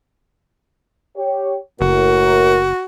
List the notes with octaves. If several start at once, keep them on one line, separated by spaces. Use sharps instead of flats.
G4 C#5
F#1 A2 F#4 A#4